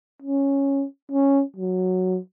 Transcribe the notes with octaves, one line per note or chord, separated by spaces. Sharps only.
C#4
C#4
F#3